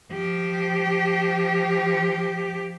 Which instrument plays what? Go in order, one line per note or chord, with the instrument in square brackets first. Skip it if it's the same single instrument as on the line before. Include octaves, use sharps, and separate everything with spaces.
[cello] F3 G4